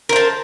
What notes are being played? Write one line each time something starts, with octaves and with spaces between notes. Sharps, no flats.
A#4 C5 A5